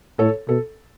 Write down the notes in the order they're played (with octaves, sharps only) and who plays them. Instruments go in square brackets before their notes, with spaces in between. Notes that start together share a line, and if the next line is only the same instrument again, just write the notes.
[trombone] A2 [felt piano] A4 C#5
[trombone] B2 [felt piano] A4